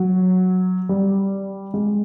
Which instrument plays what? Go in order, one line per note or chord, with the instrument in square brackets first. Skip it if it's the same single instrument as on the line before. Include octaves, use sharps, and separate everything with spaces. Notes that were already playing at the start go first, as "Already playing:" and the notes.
Already playing: [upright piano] F#3
G3
G#3